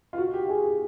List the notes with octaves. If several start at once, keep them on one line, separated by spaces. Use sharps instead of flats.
F4
F#4
G4
G#4